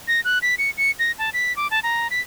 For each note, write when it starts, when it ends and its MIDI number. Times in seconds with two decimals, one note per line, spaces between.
0.08 0.21 94
0.25 0.39 90
0.42 0.55 95
0.58 0.70 97
0.78 0.91 97
0.99 1.12 94
1.18 1.30 81
1.33 1.55 95
1.57 1.70 86
1.71 1.80 81
1.83 2.08 82
2.11 2.21 95